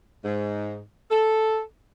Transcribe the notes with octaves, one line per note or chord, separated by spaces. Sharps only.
G#2
A4